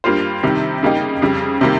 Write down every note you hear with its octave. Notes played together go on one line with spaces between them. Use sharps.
G2 G3 A#3 F4 C5
C3 D#3 G3
C#3 G3 A#3 D#4 G4
F2 C#3 G3
C3 D#3 G3 A#3